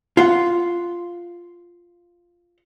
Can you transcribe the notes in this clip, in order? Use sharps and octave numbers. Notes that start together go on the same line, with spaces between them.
F4 F#5